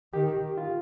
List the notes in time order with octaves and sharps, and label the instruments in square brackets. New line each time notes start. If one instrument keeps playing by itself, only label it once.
[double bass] D#3 [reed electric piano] G4
[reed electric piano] F4